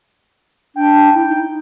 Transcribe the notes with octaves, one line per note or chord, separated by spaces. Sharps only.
D4 G5
E4
D#4